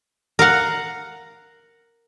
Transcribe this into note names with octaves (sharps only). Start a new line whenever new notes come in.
A#4 F5 F#5